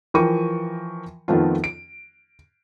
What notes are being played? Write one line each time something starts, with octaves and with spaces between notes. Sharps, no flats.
E3 F3 A#4 G5 C#6 D#7
F2 D#3 F3 A3 B3 F4
D7